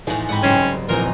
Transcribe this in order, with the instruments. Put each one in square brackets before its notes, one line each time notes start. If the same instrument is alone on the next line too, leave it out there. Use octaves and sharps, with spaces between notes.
[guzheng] A2 F3 [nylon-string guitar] E3 D#4 G#4
[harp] G#2 D#5 B5 [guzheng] C4 B4 F#5
[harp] F#1 C7 E7 [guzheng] G#2 G3 [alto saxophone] C#4
[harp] A#1 [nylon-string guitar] E3 C4 [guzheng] D#4 D#5 [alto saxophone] A#4